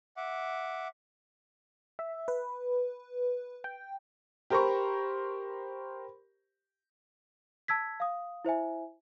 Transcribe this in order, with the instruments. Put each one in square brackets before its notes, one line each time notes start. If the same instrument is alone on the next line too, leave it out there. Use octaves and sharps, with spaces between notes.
[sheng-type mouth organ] E5 F#5 D6
[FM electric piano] E5
B4
G5
[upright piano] G4 A#4 C5 A#5 B5 C#6
[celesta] A5 E6 G#6 B6
F5 D#6
E4 C5 E5 G#5